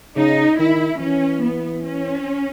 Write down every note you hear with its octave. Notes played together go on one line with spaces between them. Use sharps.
C#3 D#4
D#3 E4
E3 C#4
B3
C#4